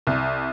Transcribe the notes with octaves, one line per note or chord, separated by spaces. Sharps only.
C2